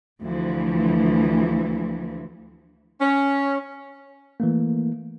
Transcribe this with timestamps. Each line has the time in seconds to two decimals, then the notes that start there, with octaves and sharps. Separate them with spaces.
0.23 D2 E3 F3
3.01 C#4
4.40 E3 A3 A#3